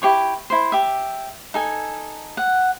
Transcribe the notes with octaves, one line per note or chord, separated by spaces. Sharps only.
E4 G4 C#5 C#6
E4 C5
G4 E5
D#4 A4 G#5
F#5